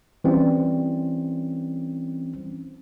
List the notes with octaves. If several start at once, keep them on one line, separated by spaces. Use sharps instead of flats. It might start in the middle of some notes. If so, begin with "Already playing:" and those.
E3 G3 C4 C#4